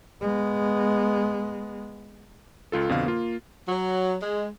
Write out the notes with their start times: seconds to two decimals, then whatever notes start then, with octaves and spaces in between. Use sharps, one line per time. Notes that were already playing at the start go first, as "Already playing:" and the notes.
0.20 G#3 B3
2.72 C#2 F4 A4
2.89 F2 B2 D3 F5
3.06 A#3 F4
3.68 F#3
4.21 G#3